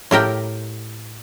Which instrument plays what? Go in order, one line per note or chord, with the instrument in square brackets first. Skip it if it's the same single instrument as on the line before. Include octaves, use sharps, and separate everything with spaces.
[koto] A2 G4 A#4 G5